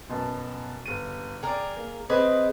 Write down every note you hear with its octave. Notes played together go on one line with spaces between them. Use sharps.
F#2 B2 A5
G1 D#7
G#4 A#4 D5 G5
A#3
C4 G#4 B4 D#5